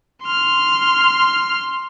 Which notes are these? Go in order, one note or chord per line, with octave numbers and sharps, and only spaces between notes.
C6 F6